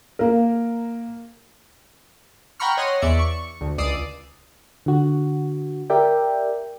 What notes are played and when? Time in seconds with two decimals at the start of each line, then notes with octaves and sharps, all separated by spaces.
0.19 A#3 A#4
2.60 F#5 G5 A#5 B5 C#6 F6
2.77 C#5 D#5 F#5 C6 D#6 A#6
3.02 E2 D5 E5 C#7
3.19 C#6
3.61 D2
3.78 C#2 D5 D#6 E6 C7
4.86 D3 F#4
5.90 G4 A#4 D5 E5 G5